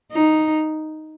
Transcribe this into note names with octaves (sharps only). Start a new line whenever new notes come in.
D#4